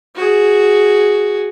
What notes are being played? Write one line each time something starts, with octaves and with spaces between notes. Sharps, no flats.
F#4 G#4